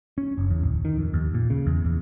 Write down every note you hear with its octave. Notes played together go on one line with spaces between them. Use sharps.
C#4
F#1
E2
D1
D#3
F2
D#2
A#2
C#3
E2
E2